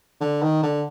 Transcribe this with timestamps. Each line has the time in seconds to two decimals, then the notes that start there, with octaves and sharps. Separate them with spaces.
0.21 D3
0.42 D#3
0.63 D3